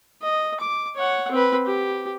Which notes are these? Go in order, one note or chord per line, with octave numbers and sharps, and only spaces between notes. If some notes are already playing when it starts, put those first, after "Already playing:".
D#5
D6
C#5 F#5
C4 B4
G4